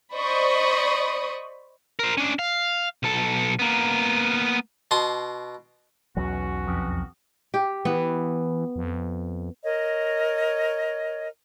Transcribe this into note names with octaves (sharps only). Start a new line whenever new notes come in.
C5 D5 D#5 B5 C#6 D#6
A#4 C5
C#4 D4
F5
B1 A4
A#3 B3
B2 A5 C6 D#6
B1 E2 B2 F#3 C#4 F#4
F2
G4
E3 B3
F2
A#4 C#5 D#5